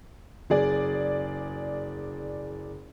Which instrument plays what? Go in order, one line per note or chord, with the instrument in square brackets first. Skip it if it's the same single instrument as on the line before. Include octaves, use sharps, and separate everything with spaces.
[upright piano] F#1 G#4 D5